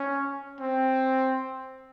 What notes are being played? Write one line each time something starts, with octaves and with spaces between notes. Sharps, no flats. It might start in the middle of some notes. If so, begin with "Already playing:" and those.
Already playing: C#4
C4